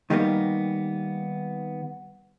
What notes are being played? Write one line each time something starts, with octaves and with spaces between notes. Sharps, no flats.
D#3 G3 A#3 B3